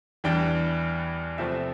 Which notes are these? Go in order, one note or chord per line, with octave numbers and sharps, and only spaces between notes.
E2 E3 G3 D4 G5
C3 F3 A3 E5